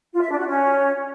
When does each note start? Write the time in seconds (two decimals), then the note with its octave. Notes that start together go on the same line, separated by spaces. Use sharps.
0.14 F4
0.22 E5
0.30 D4
0.39 F#4
0.47 C#4